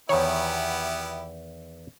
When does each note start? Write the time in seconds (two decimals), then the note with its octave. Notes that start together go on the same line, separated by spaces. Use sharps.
0.09 E2 D#3 B3 E4 G4 C#5